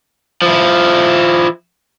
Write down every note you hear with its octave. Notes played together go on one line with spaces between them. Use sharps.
F3 E4